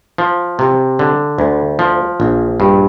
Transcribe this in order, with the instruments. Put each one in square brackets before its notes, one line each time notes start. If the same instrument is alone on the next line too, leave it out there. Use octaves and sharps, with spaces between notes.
[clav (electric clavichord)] F3
C3
D3
D2
F3
A#1
G2